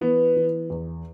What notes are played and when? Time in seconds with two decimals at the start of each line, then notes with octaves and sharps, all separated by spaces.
0.01 E3 B3
0.36 E3
0.70 E2